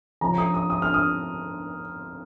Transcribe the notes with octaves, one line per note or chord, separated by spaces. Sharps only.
F3 C#4 F4 A#5
D#6
D#6
D#6
F6
D#6